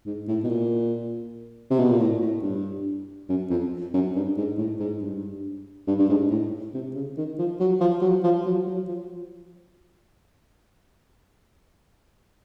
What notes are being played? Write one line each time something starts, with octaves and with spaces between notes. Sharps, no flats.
G#2
A2
B2
A#2
C3
B2
A#2
A2
A2
G2
F#2
F2
F#2
G2
G#2
A2
G#2
G2
G2
G2
G#2
A2
C3
C#3
D#3
F3
F#3
F3
F#3
F3
F#3
F#3
F3